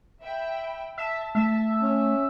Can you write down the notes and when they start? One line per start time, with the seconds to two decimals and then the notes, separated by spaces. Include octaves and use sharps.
0.22 E5 G5 B5
0.98 E5 A5
1.35 A3 E5
1.82 C#4